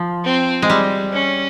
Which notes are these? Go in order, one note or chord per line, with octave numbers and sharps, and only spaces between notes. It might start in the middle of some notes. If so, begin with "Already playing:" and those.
Already playing: F3
C4
G#3
G3
C#4